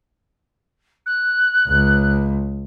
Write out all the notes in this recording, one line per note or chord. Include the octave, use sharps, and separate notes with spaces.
F#6
C#2